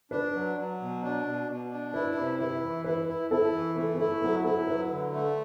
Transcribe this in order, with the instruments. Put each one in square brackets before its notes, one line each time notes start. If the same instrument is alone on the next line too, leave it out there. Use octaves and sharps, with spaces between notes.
[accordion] D4 [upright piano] B4
[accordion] F#3
F#3
B2
D4
B2
B2
D4
[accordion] E4 [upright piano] B4
[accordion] C3
[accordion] E4 [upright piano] B4
[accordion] E3
[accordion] E4 [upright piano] B4
[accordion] E4
[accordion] E4 [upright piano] A4
[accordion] E3
[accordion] A3 [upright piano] A4
[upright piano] A4
[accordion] E4 [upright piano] B4
[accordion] F#3 [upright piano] A4
[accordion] E4 [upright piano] A4
[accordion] F#3 [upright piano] B4
[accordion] D3
A3